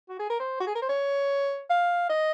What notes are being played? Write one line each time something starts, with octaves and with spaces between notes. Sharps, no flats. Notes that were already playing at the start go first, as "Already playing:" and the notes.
F#4
G#4
A#4
C5
F#4
G#4
A#4
C5
C#5
F5
D#5